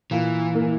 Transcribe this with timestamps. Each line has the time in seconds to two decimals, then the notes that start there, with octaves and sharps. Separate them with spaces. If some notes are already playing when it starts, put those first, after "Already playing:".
0.11 A#2 E3
0.55 A#3